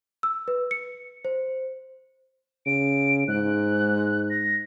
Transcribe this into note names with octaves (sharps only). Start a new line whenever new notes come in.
E6
B4
C#7
C5
C#3 D7
G#2 F#6
A#6